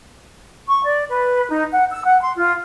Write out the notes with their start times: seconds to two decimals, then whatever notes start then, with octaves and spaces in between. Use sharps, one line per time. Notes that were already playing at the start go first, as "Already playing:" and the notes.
0.68 C#6
0.84 D5
1.09 B4
1.50 D#4
1.71 F#5
1.91 E6
2.05 F#5
2.22 C6
2.35 F4